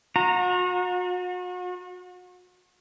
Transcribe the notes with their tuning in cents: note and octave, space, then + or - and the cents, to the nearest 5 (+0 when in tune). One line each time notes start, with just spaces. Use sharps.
F#4 -40 A#5 +0